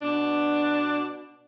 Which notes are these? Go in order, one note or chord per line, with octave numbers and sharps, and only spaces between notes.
B2 D4